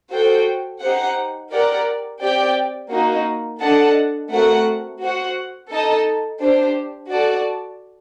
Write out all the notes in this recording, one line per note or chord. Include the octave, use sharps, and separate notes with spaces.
F#4 A4 C5 G5
D#4 G4 C5 F#5
G4 A#4 D5 F#5
C4 G4 D5 G5
A#3 D#4 F#4
D4 A4 D#5 F#5 A5
A3 C4 F#4 A#4 F#5
F#4 C5 F#5
D#4 A4 D#5 A5
D4 G4 C5
F#4 A4 D5 A5